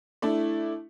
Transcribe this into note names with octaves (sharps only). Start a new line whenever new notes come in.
A3 D4 E4